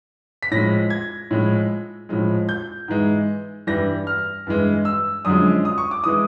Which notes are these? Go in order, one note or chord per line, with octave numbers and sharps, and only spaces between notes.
B6
A2 F3 G#3 A#6
G#6
A2 F3 G#3
A2 F3 G#3
G6
G#2 E3 G#3
G2 E3 G3 A#6
F6
G2 E3 G#3
E6
F#2 D3 F3 G#3 D#6
D#6
C#6
D6
E3 G#3 D#6